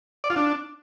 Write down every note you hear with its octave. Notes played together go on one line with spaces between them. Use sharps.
D5
F4
D4